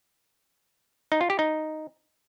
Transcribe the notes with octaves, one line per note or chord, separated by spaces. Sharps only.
D#4
F4
G4
D#4